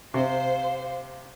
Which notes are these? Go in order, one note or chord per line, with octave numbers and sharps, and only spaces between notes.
C3 C5 F5